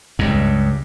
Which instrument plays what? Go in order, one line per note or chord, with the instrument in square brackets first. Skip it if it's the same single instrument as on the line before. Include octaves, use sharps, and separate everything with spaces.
[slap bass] C#2 G2